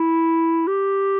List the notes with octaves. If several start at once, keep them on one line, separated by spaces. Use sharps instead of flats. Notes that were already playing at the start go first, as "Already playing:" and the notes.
Already playing: E4
G4